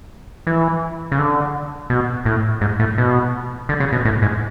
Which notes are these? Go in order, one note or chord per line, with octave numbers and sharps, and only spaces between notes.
E3
C#3
D3
B2
A2
G#2
A2
B2
D3
C#3
B2
A2
G#2